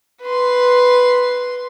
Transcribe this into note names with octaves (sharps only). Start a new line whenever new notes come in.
B4 C6